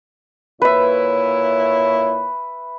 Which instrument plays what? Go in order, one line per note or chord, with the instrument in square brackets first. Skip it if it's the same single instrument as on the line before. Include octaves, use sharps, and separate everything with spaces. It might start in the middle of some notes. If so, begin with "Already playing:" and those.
[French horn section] A#2 E4 C#5 [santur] B4 E5